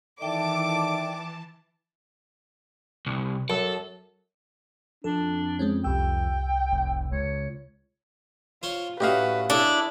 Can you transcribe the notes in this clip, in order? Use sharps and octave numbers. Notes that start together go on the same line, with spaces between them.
D#3 E3 A4 D5 E5 G5 A5 D6
C2
F#2 A4
F2 D4 A4
G#3 C4 C#4
C2 G5 E6
F1
C#2 C#5
F4 C5 C#5 C6
A2 C#4 F#4 G4 B4 D#5 F5
D4 E4 G#4 A4 C#5